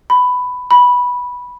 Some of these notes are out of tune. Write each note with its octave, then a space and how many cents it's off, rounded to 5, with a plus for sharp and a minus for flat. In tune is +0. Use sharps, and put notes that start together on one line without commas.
B5 +10
B5 -10